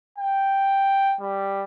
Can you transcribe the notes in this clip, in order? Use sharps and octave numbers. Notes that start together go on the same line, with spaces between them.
G5
G3